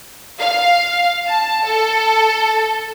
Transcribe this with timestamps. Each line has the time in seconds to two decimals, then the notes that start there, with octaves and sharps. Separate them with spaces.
0.40 F5
1.27 A5
1.65 A4